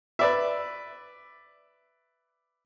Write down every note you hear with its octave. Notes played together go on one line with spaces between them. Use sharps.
B4 D5 E5